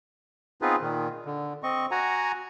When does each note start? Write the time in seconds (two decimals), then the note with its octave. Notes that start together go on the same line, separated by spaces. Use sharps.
0.62 B3 C4 D#4 F4 G#4 B4
0.81 A#2 D#3
1.26 D3
1.63 C4 D#5 C#6
1.91 F#4 F#5 G#5 A#5